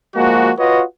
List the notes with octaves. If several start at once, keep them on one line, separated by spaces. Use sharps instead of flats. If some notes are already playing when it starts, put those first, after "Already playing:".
F3 G#3 A#3 F#4
F4 F#4 B4 C#5 D#5